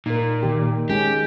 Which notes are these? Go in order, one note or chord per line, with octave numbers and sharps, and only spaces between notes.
A#2 D#4 A#4
D#3 G4
G#3 C#4 G4